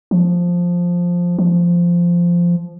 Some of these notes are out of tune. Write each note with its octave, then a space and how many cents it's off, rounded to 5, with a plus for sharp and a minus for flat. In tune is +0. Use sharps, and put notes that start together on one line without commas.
F3 +5
F3 -10